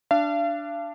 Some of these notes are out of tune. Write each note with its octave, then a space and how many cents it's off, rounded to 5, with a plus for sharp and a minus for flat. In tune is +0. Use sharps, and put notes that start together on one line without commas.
D4 +0 F5 -40